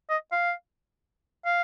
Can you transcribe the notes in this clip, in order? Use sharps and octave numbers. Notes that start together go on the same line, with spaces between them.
D#5
F5
F5